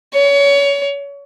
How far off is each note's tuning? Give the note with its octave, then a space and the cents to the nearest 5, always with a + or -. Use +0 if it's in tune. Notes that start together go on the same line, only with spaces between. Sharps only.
C#5 +25